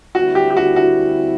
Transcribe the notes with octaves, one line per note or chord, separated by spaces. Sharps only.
D2 D3 G3 C4 E4 F#4
G4
G4
F#4
F#4